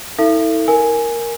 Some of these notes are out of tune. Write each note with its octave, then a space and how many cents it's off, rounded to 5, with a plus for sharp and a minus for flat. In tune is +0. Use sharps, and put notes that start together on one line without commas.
E4 -40 A4 +25 E5 +40
A#4 +0 G#5 +0